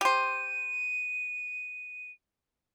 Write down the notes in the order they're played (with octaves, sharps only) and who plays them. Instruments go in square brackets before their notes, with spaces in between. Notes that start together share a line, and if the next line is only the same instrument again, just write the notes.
[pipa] G4 C5 [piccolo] D#7